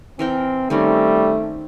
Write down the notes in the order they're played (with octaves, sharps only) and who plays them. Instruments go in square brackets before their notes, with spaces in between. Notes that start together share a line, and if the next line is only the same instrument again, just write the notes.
[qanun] E3 A#4 G5 [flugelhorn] C4
[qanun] D#3 C4 C#4 [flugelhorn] G3 [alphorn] A3